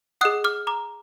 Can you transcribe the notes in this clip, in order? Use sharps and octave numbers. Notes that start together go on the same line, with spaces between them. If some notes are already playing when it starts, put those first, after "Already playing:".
G#4 D#5 F#5 D#6 F#6
D6 F6
A#5 D6